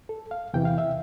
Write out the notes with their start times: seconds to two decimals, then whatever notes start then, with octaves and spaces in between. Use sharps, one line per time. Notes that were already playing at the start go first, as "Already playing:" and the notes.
0.09 A4
0.31 F5
0.54 E2 C3 E3 G5
0.65 F5
0.78 E5